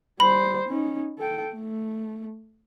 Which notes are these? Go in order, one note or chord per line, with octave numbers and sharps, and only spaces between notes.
G3 C5 B5
C#4 D#4
A4 G5
A3